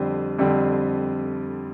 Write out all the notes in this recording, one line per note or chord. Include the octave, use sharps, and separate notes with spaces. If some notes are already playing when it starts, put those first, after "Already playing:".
Already playing: F2 D3 G3 C4
F2 D3 G3 C4